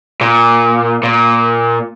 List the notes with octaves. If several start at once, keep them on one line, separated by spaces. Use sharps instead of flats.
A#2
A#2